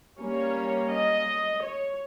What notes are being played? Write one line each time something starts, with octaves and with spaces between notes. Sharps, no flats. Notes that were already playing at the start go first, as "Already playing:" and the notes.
G3 A#3 C#4 C#5
D#5
C#5